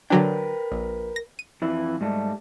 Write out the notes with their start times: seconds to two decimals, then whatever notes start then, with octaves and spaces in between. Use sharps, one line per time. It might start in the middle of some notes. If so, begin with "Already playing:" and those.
0.10 D3 F#3 D4 A#4 B4 G5
0.72 A#1
1.16 A#6
1.39 D#7
1.62 F2 E3 E4
2.01 G#2 G3 A3